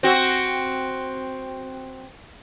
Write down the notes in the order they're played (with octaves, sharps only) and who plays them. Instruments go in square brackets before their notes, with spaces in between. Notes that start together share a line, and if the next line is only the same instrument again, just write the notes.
[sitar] C4 F#4